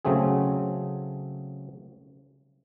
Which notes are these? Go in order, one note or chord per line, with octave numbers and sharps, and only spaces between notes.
C#3 F#3 A3 C4 G#4